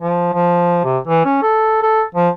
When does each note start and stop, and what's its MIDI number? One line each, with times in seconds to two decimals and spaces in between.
0.02 0.30 53
0.33 0.80 53
0.84 0.98 48
1.07 1.25 52
1.25 1.41 61
1.42 1.78 69
1.83 2.03 69
2.15 2.29 53